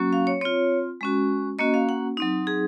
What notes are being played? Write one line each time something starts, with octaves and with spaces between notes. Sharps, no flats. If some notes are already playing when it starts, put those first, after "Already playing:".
Already playing: F#3 A#3 C#4 F#4
F5
C#5
C4 F4 C#5
G#3 C#4 F#4
A#3 C#4 F#4 D#5
F5
F#5
F#3 C4 D#4
G#4